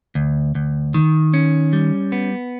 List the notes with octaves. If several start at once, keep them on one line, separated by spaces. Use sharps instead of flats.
D2
D2
D#3
C#4
G3
B3